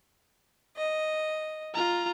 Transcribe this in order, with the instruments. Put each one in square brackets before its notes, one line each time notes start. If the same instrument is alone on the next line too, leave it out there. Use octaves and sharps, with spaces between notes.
[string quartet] D#5
[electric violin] F4 A#5